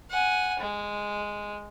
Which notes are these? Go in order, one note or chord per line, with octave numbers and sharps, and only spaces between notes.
F#5 G#5
G#3